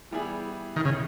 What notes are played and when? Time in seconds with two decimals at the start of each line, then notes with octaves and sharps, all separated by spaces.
0.11 E3 G3 B3 E4 G#4
0.76 D#3
0.85 C#3